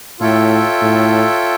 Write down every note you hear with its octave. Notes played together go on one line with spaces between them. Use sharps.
A2 F4 A4 C#5 E5 G5
A2